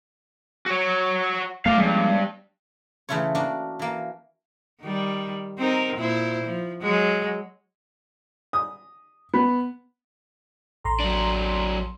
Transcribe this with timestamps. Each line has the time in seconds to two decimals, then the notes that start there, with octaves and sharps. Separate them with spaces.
0.66 F#4 C#5
1.66 A3 D5 F5
1.78 G2 F3 G#3
3.09 C#3 E3 A3 E4 F4 C#5
3.35 A#3 D4 F#4
3.79 E3 A#3
4.81 D#3 G3
5.58 C4 D#4 A#4
5.96 A#2 E4 C5
6.44 F3
6.82 F#3 G#3
8.53 D#6
9.34 B3
10.84 A1 A#5 C6
10.99 F#3 D4